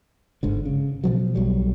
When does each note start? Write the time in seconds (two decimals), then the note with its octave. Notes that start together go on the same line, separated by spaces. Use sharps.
0.43 G1 G#2 D3
0.65 C#3
1.04 B2 F3 F#3
1.35 B1 F#3 G3